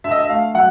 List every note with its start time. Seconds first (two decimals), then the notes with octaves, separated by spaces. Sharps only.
0.04 D3 E5
0.11 D#5
0.19 E5
0.29 A3 F5
0.55 F#3 F#5